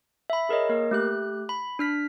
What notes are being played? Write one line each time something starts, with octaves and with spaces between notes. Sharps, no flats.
E5 B5
G#4 A#4 C#5 D#5
A#3 A#4
A3 G4 F#6
B5
D4 F6 B6